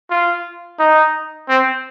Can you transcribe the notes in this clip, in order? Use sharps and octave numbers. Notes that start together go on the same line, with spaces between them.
F4
D#4
C4